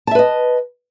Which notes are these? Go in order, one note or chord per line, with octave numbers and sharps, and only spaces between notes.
B4 D#5 E5 A5